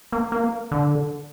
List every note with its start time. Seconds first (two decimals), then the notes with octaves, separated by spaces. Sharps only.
0.12 A#3
0.32 A#3
0.71 D3